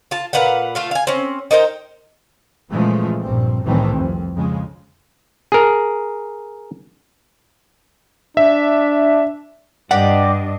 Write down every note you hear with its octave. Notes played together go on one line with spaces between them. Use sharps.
F4 A5
A#2 B4 F5 F#5
A3 F4 F5
F5 G#5
C4 C#4
D#4 A#4 C5 G5
A#2 C#3 E3 F3 G#3 A3
A#1 G2 C4
C2 A2 D#3 E3 A3 C4
F2
F2 C#3 G#3
G#4 A#4
D4 E5
G2 D4 G4 D5 D#5 F#5